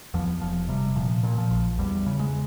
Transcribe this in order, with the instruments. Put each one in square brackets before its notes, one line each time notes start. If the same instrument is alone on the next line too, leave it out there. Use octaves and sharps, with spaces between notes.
[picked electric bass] E2 F3
E1 F3
C3 G3
A#2 F3
A#2
F3
A#1
E2 G3
C#3
G#3